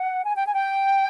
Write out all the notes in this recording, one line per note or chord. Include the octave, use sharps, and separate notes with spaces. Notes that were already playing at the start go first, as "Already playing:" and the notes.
Already playing: F#5
G#5
G5
G#5
G5